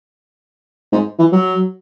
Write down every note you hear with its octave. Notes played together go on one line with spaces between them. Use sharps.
G#2
E3
F#3